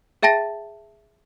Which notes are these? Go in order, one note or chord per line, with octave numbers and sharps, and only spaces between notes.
G#4 E5 G5 A5 A6 A#6